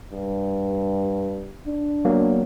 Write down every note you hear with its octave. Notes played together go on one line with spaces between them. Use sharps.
G2
D4
F#3 A#3 B3